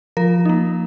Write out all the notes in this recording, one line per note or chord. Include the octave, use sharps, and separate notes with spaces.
F3 A#4
A#3 D#4